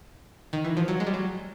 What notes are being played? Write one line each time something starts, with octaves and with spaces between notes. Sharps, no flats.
D#3
E3
F3
F#3
G#3
G3
F#3